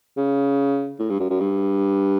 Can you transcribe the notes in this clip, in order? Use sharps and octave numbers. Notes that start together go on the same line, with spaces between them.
C#3
A2
G2
F#2
F#2
G2